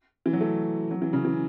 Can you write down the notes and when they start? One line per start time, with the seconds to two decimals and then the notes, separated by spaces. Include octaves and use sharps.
0.26 E3
0.33 F#3
0.41 A3
0.91 F#3
1.02 E3
1.13 C#3
1.25 E3